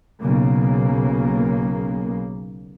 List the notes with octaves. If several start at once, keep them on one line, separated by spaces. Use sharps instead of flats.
B1 C#3 A#3